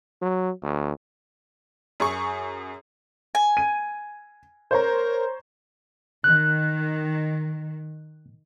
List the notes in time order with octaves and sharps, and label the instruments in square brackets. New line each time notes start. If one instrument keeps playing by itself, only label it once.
[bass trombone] F#3
D2
[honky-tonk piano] F#2 G#4 C#6
[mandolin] G#5
[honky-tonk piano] D#7
[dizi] A#4 [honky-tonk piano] C5 C#5 A#5
[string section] D#3 [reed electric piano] F#6